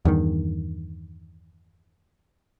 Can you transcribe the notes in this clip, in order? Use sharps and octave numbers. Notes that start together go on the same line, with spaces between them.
E2 G2 D#3